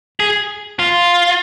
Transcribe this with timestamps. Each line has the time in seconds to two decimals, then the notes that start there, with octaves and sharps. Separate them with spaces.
0.20 G#4
0.79 F4